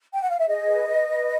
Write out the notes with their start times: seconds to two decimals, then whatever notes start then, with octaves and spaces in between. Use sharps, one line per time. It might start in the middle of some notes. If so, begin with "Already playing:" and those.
0.13 G5
0.22 F#5
0.30 F5
0.38 E5
0.47 G#4 D#5
0.67 B4
0.87 B4
1.08 B4